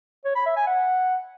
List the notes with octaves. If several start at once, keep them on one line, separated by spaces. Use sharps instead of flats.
C#5
B5
E5
G#5
F#5